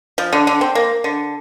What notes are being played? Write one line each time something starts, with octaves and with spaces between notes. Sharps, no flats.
F3
D3
D3
C4
A#3
D3